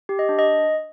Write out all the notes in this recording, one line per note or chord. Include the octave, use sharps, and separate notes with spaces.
G4
D#5
D4
D#5